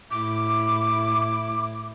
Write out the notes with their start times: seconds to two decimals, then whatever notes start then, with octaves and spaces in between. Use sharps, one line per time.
0.11 A2 E4 D6